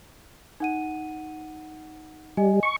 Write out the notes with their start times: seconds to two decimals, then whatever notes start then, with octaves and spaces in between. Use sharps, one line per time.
0.60 D#4 F#5 D#7
2.37 G3 D#5 G#5
2.63 C#6